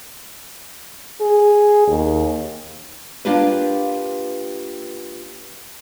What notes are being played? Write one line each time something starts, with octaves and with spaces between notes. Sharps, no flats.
G#4
D#2
A#3 D4 F4 G4 B4